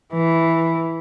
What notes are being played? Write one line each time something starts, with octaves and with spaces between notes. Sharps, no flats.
E3